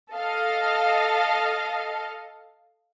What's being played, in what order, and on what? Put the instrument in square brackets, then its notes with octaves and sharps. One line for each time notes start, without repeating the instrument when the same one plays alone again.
[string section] A4 D#5 F5